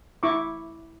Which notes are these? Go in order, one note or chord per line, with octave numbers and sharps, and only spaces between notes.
E4 C#6 D6